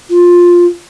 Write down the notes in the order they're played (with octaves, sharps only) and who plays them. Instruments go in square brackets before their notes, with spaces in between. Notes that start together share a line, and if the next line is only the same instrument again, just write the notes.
[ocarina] F4